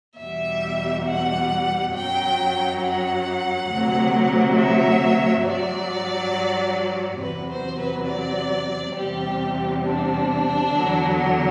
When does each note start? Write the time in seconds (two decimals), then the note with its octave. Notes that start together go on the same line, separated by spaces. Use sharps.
0.18 E2 B2 G3 E5
1.06 F#5
1.93 F#2 F#3 G5
2.82 F#5
3.70 D2 C3 F#3
4.57 E5
5.45 G2 F#3 D5
7.20 E2 C3 F#3 B4
7.50 C5
7.79 B4
8.09 D5
8.96 E2 C3 G3 G4
9.84 D4
10.73 E2 D3 F#3